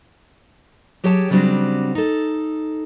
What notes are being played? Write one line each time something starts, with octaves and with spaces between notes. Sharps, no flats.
F#3 G4 G#4 C#5 G5 A5
C#3 F#3 G3 C4 D4 F#4
D#4 A4